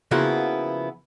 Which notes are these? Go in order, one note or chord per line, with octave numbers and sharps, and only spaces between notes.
C#3 F3 A#3 B3 E4 F#4